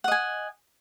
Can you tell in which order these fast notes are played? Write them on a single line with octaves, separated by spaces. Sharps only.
F#5 D#5 G#5